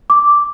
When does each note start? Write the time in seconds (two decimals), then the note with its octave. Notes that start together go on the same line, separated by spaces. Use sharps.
0.10 D6